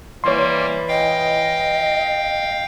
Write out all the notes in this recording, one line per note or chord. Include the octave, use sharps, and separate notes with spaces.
E3 G3 A#3 C#5 C6
D#5 F5 G5